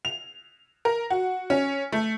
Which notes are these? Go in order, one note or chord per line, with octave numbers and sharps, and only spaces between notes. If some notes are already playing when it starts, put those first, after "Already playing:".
F7
A#4
F#4
C#4
A3